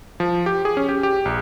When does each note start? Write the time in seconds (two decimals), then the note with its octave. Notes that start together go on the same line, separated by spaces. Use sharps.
0.20 F3
0.46 G4
0.65 G#4
0.77 C#4
0.89 G4
1.03 G4
1.25 A#1